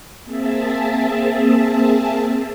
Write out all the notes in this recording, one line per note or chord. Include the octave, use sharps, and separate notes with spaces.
A#3 C4 G#4 E5 A5